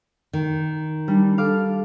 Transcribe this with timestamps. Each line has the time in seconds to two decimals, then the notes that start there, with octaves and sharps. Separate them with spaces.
0.33 D#3
1.08 G3 D4
1.38 A4 F5 D6